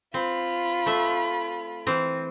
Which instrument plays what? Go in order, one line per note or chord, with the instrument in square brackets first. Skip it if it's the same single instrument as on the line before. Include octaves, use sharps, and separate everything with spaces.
[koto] C4 [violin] F4 B5
[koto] A3 E5
E3 C4